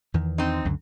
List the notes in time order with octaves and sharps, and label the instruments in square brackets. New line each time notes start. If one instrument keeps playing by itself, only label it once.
[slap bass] E2 D#3 E3
[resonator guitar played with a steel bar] C4 D#4
[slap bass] C#2 F#2 D3